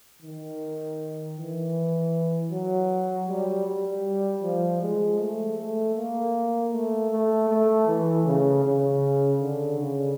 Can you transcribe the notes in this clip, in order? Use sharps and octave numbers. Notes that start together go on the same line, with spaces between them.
D#3
E3
F#3
G3
G3
F3
G#3
A3
A3
A#3
A3
A3
A3
E3
C#3
C#3
D3
C#3